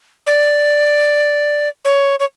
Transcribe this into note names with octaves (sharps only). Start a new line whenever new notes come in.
D5
C#5
C#5